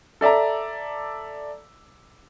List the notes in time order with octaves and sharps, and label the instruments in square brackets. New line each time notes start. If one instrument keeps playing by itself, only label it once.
[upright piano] A4 D5 E5 A5 A#5